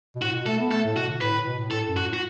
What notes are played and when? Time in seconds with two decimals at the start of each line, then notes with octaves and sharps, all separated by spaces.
0.15 B2
0.22 A2 F#4
0.34 B2
0.46 A3 A4
0.59 B3
0.71 A3 A4
0.85 A2
0.96 B2 F#4
1.09 D3
1.21 A2 B4
1.34 A2
1.46 B2
1.59 A2
1.71 A2 A4
1.88 F#2
1.97 F#4
2.05 A2
2.13 F#4